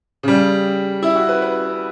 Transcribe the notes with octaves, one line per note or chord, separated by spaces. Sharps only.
C#3 G3
E4
F#4
B4
B4